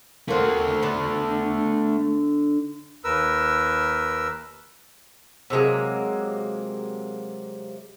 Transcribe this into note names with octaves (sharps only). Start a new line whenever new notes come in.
A3 A#3 C4 F#5
D3 B3 D4
D#2 A#4 B4 E6
C3 F#3 G#3 A#3